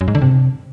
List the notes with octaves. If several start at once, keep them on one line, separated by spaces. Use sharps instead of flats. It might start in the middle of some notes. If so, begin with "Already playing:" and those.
F#2
G#2
D3
C3